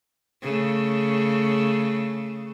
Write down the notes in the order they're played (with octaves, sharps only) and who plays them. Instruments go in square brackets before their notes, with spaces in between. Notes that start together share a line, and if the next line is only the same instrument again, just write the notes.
[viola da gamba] C#3 A3